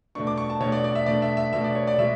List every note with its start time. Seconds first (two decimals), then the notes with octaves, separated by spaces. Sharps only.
0.15 B2 A3 D4 C#6
0.27 D6
0.38 C#6
0.50 A5
0.60 B2 A3 D4 C#5
0.72 D5
0.84 D5
0.95 E5
1.06 B2 A3 D4 D5
1.22 E5
1.37 E5
1.53 B2 A3 D4 E5
1.64 D5
1.75 C#5
1.87 D5
1.98 B2 G#3 E5